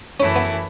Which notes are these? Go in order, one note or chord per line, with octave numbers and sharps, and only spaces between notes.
F#2 E3 A3 C#4 E4
B3